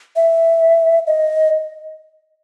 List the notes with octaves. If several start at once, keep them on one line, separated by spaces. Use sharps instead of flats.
E5
D#5